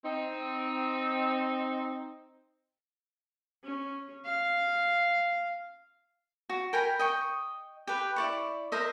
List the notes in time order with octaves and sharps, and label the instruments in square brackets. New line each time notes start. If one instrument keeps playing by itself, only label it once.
[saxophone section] C4 D#4
[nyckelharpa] C#4
F5
[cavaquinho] F#4
A#4 G5 G#5 B5
D#5 G5 C#6
G4 B4
E4 D5 C#6
A#4 C5 D#5 E5